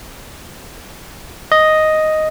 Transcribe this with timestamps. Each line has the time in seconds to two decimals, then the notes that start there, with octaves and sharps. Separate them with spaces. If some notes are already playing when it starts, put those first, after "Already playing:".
1.52 D#5